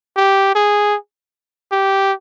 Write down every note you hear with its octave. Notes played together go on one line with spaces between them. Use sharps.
G4
G#4
G4